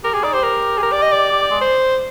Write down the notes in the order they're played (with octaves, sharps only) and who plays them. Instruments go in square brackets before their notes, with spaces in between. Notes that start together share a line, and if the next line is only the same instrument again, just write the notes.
[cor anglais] G4 [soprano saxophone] A#4
[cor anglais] G4 [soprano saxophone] G#4
[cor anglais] D#4 [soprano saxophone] D5
[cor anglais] G4 [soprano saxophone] C5
[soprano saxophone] A#4
G#4
A#4
D5
D#5
D5
[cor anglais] G4
G4
G#3
[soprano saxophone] C5